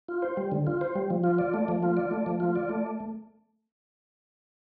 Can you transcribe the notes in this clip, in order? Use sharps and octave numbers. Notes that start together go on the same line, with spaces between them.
F4
C5
G3
D3
F4
C5
G3
F3
F4
D5
A3
F3
F4
D5
A3
F3
F4
D5
A3